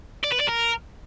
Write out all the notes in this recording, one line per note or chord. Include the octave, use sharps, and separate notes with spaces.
D5
B4
D5
A#4